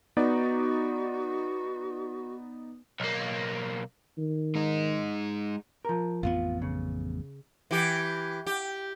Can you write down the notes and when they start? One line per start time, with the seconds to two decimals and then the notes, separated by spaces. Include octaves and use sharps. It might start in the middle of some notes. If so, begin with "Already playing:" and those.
0.17 B3 D#4 F#4 D5
3.00 B1 A#3
4.18 D#3
4.55 G#3 D#4
5.85 F3 A#4
6.23 A1 F2 B3 F4
6.62 C#3
7.71 E3 G4
8.47 G4